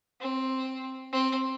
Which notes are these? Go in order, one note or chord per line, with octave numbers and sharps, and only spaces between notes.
C4
C4